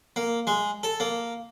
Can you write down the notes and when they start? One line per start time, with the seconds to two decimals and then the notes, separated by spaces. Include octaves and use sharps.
0.16 A#3
0.47 G#3
0.83 A4
1.00 A#3